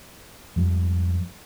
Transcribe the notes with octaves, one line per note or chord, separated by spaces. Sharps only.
F2 G#2 F3 G3